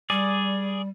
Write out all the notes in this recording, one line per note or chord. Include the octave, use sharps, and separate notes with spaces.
G3 G#4 D5